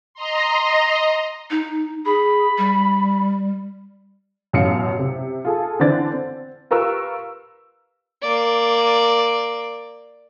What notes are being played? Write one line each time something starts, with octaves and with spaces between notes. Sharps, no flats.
D#5 A#5 C6
D#4
G#4 B5
G3
A1 F#2 B2 F5 C7 C#7
C3
F4 G#4 A4
D3 E3 C4 B4 D5 A6
C4
F4 G4 A#4 B4 C#6 E6
A#3 D5